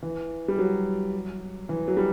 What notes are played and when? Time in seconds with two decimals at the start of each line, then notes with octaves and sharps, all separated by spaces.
0.03 E3
0.48 G3
0.59 F#3
1.69 E3
1.88 F#3
1.97 G3